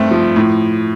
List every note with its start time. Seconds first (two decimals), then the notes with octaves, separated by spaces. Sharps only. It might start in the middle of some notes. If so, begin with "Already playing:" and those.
Already playing: G2 A3 C4
0.11 F3
0.36 A2